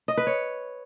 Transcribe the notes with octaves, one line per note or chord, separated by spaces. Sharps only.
D#5
B4
C#5